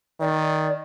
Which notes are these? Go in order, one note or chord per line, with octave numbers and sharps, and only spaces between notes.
D#3 D5